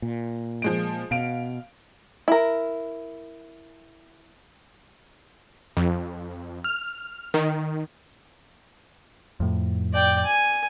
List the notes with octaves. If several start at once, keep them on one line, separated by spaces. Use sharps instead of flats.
A#2
F3 G#3 D7
B2 F5 D7
E4 A#4
F2
F6
D#3
F2 A2
D5 G5
G#5